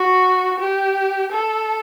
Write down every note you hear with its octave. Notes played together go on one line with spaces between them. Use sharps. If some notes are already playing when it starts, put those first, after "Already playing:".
Already playing: F#4
G4
A4